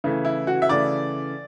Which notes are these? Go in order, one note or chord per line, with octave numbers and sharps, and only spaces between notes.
C#3 E3 A3
E4
F#4
E5
C#3 E3 A3 D5